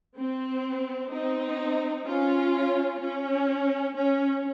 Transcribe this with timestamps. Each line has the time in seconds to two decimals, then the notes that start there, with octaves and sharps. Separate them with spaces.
0.16 C4
1.12 C4 D#4
2.05 C#4 F4
3.00 C#4
3.96 C#4